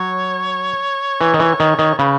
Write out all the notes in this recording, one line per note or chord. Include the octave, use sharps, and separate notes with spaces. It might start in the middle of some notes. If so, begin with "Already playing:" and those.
Already playing: F#3 C#5
E3
D#3
E3
D#3
D#3
C#3 B4